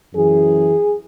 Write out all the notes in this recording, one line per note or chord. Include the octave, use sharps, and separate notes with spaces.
F#2 E3 G#4